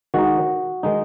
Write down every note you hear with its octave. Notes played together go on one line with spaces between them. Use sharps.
D#3 G#3 D#4 F#4
D#3 G#3 D#4